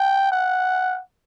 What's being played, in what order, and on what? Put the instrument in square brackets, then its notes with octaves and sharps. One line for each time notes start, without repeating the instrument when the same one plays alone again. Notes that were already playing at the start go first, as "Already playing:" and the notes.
Already playing: [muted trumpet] G5
F#5